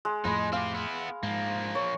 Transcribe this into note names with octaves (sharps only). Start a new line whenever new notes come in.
G#3
F2 A2 G#3 D#4 B5
C4 G4 F5
B3 E4
G#2 F3 A#3
C#5